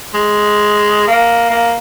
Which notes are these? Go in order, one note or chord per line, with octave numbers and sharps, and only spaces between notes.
G#3
A#3
A#3